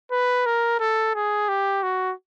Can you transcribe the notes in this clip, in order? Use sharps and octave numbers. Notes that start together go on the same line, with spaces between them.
B4
A#4
A4
G#4
G4
F#4